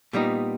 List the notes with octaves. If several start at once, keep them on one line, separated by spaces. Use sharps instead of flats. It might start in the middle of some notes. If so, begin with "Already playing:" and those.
A#2 G3 B3 D#4